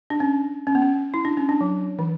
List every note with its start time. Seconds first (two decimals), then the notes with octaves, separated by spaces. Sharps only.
0.10 D4
0.20 C#4
0.67 C#4
0.75 B3
0.82 C#4
1.14 E4
1.25 D4
1.37 C#4
1.49 D4
1.61 F#3
1.99 E3